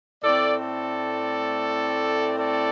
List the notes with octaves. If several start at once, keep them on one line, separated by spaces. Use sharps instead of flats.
A2 A3 C4 A4 D5
A4 D5
A4 D5